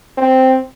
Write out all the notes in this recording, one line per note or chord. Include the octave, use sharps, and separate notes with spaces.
C4